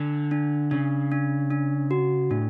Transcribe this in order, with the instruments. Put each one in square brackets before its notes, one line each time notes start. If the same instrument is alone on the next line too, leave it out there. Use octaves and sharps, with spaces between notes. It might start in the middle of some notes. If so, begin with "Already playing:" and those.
Already playing: [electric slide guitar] D3 [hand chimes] D4
[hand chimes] D4
[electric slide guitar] C#3 [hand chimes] D4
[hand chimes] D4
D4
F#4
[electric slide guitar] A2 [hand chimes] D4